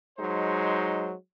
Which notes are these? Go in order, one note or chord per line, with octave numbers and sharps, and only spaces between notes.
F#3 G#3 D#4 C5